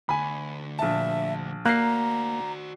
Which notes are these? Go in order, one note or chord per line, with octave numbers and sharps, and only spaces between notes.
D2 G#5 B5
A#1 E5 A5
A#3 F#4 D5 A#5 F#6 C7